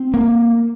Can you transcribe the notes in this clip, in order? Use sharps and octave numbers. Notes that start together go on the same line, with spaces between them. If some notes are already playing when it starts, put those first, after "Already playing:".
Already playing: C4
A#3